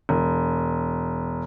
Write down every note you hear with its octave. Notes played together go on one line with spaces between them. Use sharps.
E1